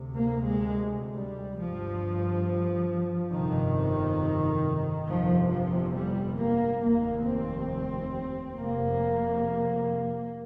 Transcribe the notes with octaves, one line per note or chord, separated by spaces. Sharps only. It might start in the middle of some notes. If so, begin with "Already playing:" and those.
Already playing: D2 C3
A#3
G#3
G3
G1 G2 F3
G1 F2 C3 D#3
G1 F2 C3 F3
F3
G3
A#3
F1 D#2 A#3
C4
F1 F2 C3 A#3